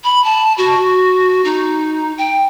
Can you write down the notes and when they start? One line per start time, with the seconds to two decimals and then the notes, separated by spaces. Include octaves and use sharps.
0.04 B5
0.24 A5
0.58 F#4
1.45 D#4
2.18 G5